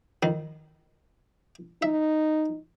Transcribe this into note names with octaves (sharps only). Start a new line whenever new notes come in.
F2 D#3
D#4 E5